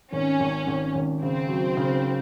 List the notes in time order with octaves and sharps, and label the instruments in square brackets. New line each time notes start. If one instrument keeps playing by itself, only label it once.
[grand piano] G#1 [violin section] C#4
[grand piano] G#1
G#1
G#1
[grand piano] C#3 [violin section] C4
[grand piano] F#3
C#3